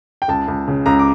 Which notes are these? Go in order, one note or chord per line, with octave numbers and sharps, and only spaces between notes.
G5
C#2 A5
C#2
C#3
C#2 A#5
D6